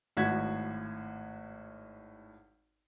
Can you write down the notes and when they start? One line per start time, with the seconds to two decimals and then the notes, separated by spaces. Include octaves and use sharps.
0.17 G#1 A2 F#4 G#6 B6